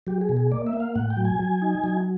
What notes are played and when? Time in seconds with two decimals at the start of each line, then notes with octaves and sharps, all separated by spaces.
0.07 F#3 G4
0.21 G#4
0.29 B2
0.37 G#4
0.52 A#3 D5
0.67 E5
0.73 A#3
0.80 F5
0.95 A2 F#5
1.10 G5
1.17 F#3
1.25 G#5
1.39 F#3
1.62 D#4
1.84 F#3